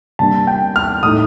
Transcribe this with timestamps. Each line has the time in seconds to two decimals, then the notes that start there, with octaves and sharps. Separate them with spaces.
0.19 C3 G3 A#3 D4 A5
0.47 G5
0.76 F6
1.03 A2 A3 D#4 D#6